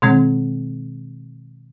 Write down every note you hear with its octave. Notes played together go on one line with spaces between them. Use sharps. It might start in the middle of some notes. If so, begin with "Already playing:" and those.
B2 D#3 G#3 C4